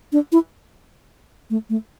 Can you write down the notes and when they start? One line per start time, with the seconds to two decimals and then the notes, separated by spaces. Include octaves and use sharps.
0.12 D4
0.32 E4
1.50 A3
1.70 A3